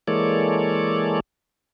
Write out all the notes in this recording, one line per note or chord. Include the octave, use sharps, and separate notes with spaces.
E3 G#3 A#3 A4 C#5 D5